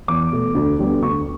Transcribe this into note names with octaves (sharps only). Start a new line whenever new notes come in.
E2 D6
B2 A3
D2
D3 G3 B3
D2 C#6